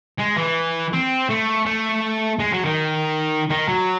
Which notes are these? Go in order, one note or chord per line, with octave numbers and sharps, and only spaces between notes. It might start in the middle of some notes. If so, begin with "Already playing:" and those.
G#3
E3
C4
A3
A3
G#3
F#3
D#3
D#3
F#3